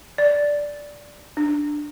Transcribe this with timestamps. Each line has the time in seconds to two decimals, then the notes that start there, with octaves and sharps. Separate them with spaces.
0.18 D5
1.37 D4